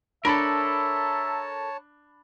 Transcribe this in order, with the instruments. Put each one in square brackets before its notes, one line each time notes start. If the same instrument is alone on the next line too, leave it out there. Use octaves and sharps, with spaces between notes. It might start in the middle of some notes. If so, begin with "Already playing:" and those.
[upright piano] D4 B5 [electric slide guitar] A4 A#4 [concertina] C#5 A5 [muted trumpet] E5